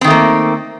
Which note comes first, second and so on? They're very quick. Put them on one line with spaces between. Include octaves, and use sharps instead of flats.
C4 D#3 A3 A#3